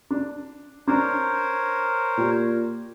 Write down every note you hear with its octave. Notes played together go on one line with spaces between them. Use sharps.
D4
D4 A#4 C5 C#5 A#5
A#2 G4